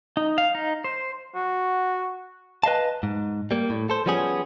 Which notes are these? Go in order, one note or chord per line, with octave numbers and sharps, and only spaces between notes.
D#4
F5
D#4
C5
F#4
B4 D#5 F5 A5
G#2
G3 A#3
A2
A4 C5
F3 G3 B3 C#4 G#4